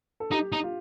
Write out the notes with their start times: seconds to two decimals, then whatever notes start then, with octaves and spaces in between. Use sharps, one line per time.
0.20 A4
0.31 D#4 G4
0.52 D#4
0.63 F4